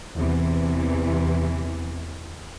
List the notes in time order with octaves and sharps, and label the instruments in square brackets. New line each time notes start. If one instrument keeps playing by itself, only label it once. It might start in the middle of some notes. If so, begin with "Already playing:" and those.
[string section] E2 C3 E3